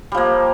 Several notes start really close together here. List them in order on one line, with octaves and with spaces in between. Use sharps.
G3 F3 A#3